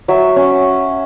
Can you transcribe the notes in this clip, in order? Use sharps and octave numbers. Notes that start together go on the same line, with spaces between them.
F#3 E5
C#4